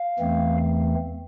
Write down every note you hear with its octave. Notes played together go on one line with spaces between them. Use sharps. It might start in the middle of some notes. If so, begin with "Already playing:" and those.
Already playing: F5
E2 E3 A3 C4